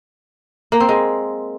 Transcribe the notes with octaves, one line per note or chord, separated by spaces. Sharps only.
A#3
C4
G#3